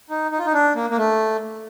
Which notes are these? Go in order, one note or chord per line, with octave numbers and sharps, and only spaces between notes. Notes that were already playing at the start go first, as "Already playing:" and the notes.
D#4
D#4
F4
D#4
D4
A#3
A#3
A3